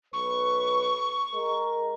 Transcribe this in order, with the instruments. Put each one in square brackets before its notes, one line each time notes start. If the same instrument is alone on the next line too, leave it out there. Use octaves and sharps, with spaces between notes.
[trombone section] B1 B4 [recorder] C#6
[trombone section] G#3 A#4